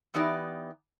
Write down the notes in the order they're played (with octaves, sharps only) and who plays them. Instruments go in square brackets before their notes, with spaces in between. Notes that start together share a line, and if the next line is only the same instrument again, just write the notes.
[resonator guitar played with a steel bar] E2 E3 B3 D#4 G4 D5